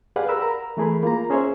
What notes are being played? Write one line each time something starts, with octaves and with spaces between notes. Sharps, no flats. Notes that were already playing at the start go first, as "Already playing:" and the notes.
G4 G#4 B4 D5 F5 F#5
A#4 B5 E6
A#5
E3 A3 G#4 A#4 B5
A#3 F4 A#5
C#4 G#4 C5 C#5 E5